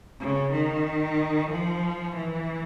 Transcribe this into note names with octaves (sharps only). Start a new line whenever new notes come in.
C#3
D#3
F3
E3